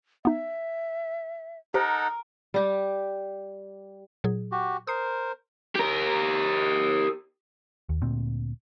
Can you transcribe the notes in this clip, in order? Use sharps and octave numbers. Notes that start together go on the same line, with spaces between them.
B3 D#4 E5
D#4 G4 A4 A#4 C5 F#5
G3 G4
A#2 F#3 G#4
F#4 G4
A#4 C5 D#6 C7
G4 A#4
D#2
D2 A#2 C4